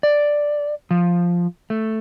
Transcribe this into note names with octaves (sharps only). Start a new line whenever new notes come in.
D5
F3
A3